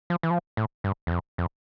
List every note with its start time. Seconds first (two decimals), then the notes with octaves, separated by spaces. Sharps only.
0.10 F3
0.23 E3
0.30 F3
0.57 A2
0.84 G2
1.07 E2
1.11 F2
1.38 F2